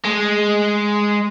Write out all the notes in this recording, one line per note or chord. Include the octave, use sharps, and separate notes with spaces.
G#3